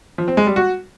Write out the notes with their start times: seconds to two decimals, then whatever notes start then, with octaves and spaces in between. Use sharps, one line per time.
0.18 F3
0.28 C4
0.37 G#3
0.47 G3
0.56 F#4